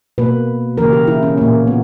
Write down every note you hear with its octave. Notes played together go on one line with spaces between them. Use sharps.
B2 A#3 B4
C#3 E3 A#3 A#4
G4
E4
C#4
A#2 A#3
B3